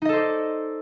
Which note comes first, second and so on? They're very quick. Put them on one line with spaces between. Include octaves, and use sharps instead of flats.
D#4 D#5 A4 C5 D5